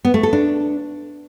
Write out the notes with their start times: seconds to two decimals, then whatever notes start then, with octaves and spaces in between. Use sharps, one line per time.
0.05 B3
0.14 A3
0.23 A4
0.33 D4